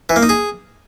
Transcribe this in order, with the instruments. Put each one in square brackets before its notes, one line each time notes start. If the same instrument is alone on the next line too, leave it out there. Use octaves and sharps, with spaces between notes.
[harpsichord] E3
A#3
D#4
G#4